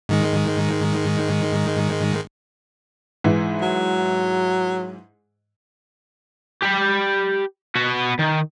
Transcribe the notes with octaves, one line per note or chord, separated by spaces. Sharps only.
G#2 D#3 G#3
G#2 E3 E4
F#3
G4 B5
B3 F#4
D#3